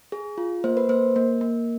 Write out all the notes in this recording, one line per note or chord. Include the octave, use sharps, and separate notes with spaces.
G#4
F4
A#3 C5
B4
A#3 C5
A#3
A#3